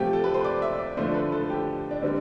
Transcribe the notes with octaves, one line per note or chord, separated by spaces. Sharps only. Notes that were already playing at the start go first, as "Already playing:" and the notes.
Already playing: C3 F3 A3 G4
A4
B4
C5
D5
E5
D5
D3 F3 A3 C5
B4
A4
G4
D4
D3 G3 C4